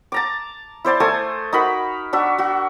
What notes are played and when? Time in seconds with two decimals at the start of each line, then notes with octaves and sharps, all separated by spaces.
0.12 A5 A#5 D6
0.85 E4 C5 D5 A5
1.00 A3 A4 G#5 D#6
1.53 D#4 F#4 A#4 B5
2.13 D4 F#4 E5
2.38 F#4